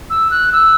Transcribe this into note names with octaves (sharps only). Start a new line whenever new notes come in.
E6
F#6
E6